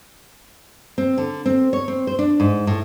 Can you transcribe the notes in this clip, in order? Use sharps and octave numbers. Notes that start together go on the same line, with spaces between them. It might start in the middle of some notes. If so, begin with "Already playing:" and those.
C4
D3
C4
C#5
C4
C5
D4
G#2
A2